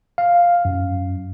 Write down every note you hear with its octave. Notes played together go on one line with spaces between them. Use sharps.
F5
F#2